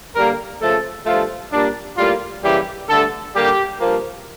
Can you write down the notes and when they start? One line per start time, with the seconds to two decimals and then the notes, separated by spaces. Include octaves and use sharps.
0.15 D3 G3 A#3 A#4
0.61 C#3 F3 A3 A4
1.06 G2 F3 A3 F4
1.52 A#2 G3 A#3 D4
1.97 A2 G3 A#3 F4
2.43 C#3 E3 G3 A#3 G4
2.88 G2 D3 A3 A4
3.34 D3 G3 A#3 G4
3.80 G2 F3 A#3